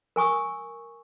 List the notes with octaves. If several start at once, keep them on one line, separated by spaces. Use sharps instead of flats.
A#4 G#5 C#6 D#6 E6